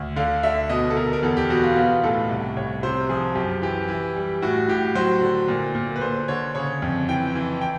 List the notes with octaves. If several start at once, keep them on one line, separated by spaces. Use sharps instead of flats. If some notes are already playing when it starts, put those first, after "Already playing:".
Already playing: D2
D3 F5
D3 E5
B2 D#5
A4
B2 A#4
A#4
E2 A4
G4
B2 F#4
F4
B3 F4
A2 A4
C2
C2 C#5
C3 C5
F3 G#4
F#2 G4
E3 G4
E3
G3
A2 F#4
A2 G4
F#3 C5
D3
A#2
A#2
B4
D3 C5
D3 C#5
C#3 C#5
F2
E3 G5
E3
G5